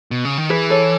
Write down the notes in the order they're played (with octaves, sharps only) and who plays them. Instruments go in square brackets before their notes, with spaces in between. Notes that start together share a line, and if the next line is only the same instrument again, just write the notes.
[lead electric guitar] B2
C#3
D#3
[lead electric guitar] E3 [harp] G#4 B4
[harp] A4 C#5